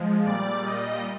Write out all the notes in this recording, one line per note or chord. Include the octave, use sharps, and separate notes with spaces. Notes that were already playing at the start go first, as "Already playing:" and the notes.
Already playing: F3 G#3
A#2 G3 D5
D#5